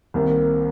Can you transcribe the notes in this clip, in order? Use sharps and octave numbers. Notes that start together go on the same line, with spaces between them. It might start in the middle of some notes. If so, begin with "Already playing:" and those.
C2 C3 D#3 A#3